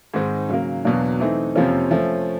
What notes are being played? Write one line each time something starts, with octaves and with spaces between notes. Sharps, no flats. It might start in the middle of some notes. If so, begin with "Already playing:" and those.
G#2 D#3 G#3 C4 D#4
C#3 F#3 A#3
E2 B2 F#3 A#3 D4
E3 A3 C4 D#4
F2 C3 F3 A#3 C#4
F3 A3 C#4